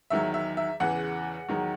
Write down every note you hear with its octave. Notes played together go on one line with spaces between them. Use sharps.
E2 D#3 F#3 E5
E5
E5
E2 C#3 E3 F#5
E2 D#3 F#3